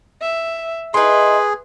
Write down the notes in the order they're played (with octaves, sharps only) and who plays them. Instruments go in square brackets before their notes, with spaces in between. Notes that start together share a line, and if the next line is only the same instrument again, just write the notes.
[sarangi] E5
[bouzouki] D#4 E4 [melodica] G#4 [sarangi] B4 [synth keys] C6